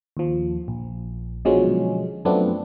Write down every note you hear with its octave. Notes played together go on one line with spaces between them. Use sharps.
D#2 F3
A#1
B2 D3 F3 F#3 G#3 C#4
F#2 F3 A3 B3 C4 D4